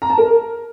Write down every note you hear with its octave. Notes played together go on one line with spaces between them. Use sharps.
A#5
A5
A#4